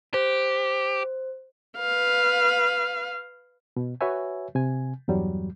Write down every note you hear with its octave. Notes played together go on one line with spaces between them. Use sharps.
G4 C5
B4 F5
B2
F#4 B4 C#5 E5 G#5
C3 G#5
E2 G2 F#3 G3